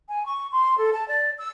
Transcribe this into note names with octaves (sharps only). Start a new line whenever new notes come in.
G#5
C#6
C6
A4
A5
D5
E6